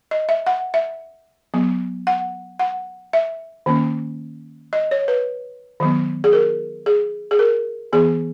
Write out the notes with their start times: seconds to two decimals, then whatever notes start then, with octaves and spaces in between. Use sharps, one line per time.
0.11 D#5
0.29 E5
0.46 F#5
0.74 E5
1.54 F#3 B3
2.07 F#5
2.59 F#5
3.13 E5
3.66 D#3 A#3 C#4
4.73 D#5
4.91 C#5
5.08 B4
5.80 D#3 F#3 B3
6.24 G#4
6.33 A#4
6.86 G#4
7.31 G#4
7.39 A#4
7.93 E3 B3 G#4